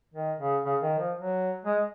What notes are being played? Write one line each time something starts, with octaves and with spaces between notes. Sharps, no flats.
D#3
C#3
C#3
D#3
F3
F#3
G#3